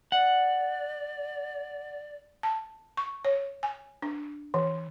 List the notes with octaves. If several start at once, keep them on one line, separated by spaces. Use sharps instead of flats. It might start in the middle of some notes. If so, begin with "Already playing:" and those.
D5 F#5
A5
C#6
C#5
G#5
D4
E3